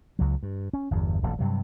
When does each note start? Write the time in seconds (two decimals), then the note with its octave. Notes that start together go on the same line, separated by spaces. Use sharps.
0.19 C#2 F#3
0.43 G2
0.73 C#4
0.91 G1 E2
1.23 D#1 A1 F2
1.39 G2 C3 F#3